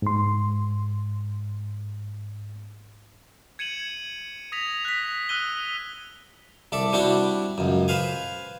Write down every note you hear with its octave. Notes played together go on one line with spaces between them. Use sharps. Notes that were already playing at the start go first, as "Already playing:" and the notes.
G#2 C6
G#6 C#7 D#7 E7 F#7
D#6 G#6 A#6 B6 F7
F#6 B6
D#6 E6 F#6 D#7 G7
C2 A4 D5 E5
G3 C4 D4 E4 F#4 G4
C#2 F#2
B4 C5 F5 G#5